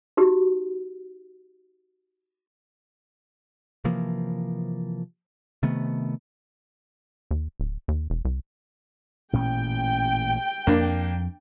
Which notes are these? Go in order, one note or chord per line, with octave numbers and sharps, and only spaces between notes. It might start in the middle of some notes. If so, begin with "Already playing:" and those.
D#4 F#4 G4
C3 E3 F3 A#3
C3 D#3 A3 B3
D#2
D1
D#2
E1
C2
A1 A#2 C#4 G5
F2 A#3 D4